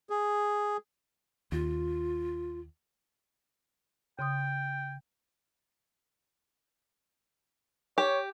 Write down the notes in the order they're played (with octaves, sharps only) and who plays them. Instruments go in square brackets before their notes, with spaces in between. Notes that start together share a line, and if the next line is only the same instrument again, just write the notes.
[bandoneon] G#4
[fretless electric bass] D#2 [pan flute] F4
[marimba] C#3 C6 D#6 [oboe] G5
[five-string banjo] G4 [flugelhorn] C#5